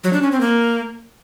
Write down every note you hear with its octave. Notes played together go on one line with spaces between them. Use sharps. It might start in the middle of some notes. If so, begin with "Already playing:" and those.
F#3
D4
C#4
C4
A#3